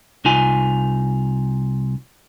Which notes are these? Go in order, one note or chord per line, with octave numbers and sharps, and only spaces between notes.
C2 D#4 F4 G#5